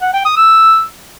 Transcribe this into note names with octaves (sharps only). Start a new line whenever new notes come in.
F#5
G5
D#6
E6